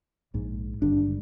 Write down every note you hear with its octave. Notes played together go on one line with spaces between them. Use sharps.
A#1 G#2
G#1 G2 D3 D4